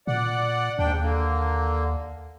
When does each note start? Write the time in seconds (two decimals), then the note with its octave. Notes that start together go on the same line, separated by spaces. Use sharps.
0.07 A#2 D5 F#5
0.79 D#2 G#2 D4 G5
1.01 D3 A#3